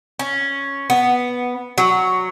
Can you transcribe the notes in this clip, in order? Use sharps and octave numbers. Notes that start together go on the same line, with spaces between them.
C#4
B3
F#3